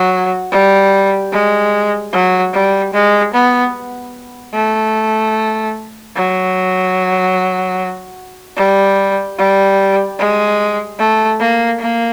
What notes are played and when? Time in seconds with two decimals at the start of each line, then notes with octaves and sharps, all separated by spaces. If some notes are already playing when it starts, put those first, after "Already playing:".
Already playing: F#3
0.51 G3
1.32 G#3
2.12 F#3
2.53 G3
2.93 G#3
3.33 B3
4.54 A3
6.16 F#3
8.57 G3
9.38 G3
10.19 G#3
10.99 A3
11.39 A#3
11.80 A#3